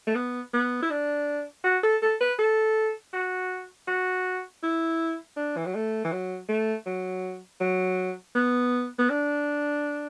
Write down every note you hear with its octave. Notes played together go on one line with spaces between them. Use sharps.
A3
B3
B3
E4
D4
F#4
A4
A4
B4
A4
F#4
F#4
E4
D4
E3
F#3
A3
E3
F#3
A3
F#3
F#3
B3
B3
D4